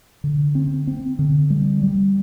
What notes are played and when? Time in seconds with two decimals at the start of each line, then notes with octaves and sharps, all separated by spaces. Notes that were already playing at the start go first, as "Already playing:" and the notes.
0.24 D3
0.55 C4
0.87 C4
1.19 D3
1.50 G3
1.83 G3